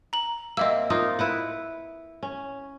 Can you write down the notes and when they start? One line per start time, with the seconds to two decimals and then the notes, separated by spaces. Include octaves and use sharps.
0.13 A#5 F#7
0.57 A#3 C4 D#5 E5 E6
0.90 A#3 D#4 F4 D#6
1.19 E4 B4 F#5
2.23 C#4